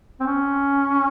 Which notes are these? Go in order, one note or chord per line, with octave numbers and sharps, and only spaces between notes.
C4
C#4